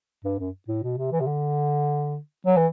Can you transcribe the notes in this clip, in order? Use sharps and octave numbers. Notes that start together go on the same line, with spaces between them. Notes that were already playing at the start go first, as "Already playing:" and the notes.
G2
F#2
A2
B2
C3
E3
C3
D3
F#3
E3